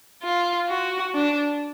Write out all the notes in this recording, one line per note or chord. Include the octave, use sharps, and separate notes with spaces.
F4
F#4
D4